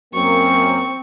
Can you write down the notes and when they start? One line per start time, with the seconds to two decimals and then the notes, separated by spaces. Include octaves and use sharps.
0.14 F#2 A#3 C4 C#6